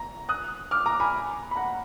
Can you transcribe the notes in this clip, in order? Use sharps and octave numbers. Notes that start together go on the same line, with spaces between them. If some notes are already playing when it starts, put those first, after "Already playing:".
Already playing: A#5
D#6 F#6
D6 F6
A#5 D6
G#5 B5
B5
F#5 A#5